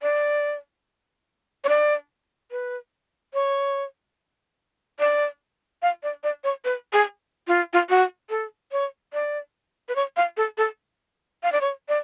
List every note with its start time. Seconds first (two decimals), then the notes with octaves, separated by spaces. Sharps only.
0.02 D5
1.64 C#5
1.69 D5
2.51 B4
3.34 C#5
4.99 D5
5.82 F5
6.03 D5
6.24 D5
6.44 C#5
6.65 B4
6.93 G#4
7.48 F4
7.73 F4
7.89 F#4
8.30 A4
8.72 C#5
9.13 D5
9.89 B4
9.96 C#5
10.17 F5
10.37 A4
10.58 A4
11.43 F5
11.52 D5
11.61 C#5
11.89 D5